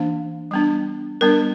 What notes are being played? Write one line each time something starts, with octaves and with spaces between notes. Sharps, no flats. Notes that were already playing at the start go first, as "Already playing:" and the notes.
Already playing: E3 A#3 D4
G3 B3 D4
G3 B3 D4 A#4